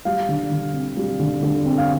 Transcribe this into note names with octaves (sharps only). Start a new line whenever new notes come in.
G3 F5
D3
D3
C4
G3
D3
D3
C4
F5